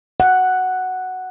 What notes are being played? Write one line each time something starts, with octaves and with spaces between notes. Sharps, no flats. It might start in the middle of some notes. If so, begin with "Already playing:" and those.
F#5